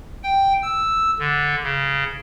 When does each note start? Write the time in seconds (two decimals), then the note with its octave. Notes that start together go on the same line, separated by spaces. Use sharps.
0.23 G5
0.63 E6
1.19 D3
1.63 C#3